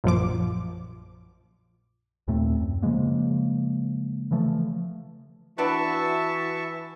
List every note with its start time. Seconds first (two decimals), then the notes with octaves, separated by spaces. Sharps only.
0.04 A#1 F#2 F3 D6
2.28 D#2 A#2 A3 C4
2.61 F#2
2.83 C#3 F3 G#3 A#3
4.31 C#3 E3 F3 A3
5.58 E3 B3 D4 F#4 B4 E5 A5 C#6